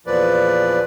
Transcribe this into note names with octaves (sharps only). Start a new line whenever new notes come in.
E2 A#2 F3 B4 D5